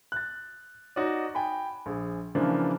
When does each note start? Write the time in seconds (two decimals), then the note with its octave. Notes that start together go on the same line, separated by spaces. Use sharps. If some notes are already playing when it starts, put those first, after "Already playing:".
0.12 F#6 A6
0.96 D#4 F#4 C#5 D5
1.35 G5 G#5 B5
1.86 A#1 G#4
2.35 C#3 E3 F3 A#3 D4